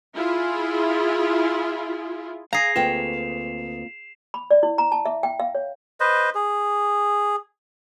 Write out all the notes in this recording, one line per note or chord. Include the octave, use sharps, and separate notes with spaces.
E4 F4 G#4
G#4 F5 A#5 C7 F7
D2 A#3 C4 F4 B4 G5 E7
B5
D5
E4
A#5
A5
E5
G5
F5
C#5
B4 C5 D#5
G#4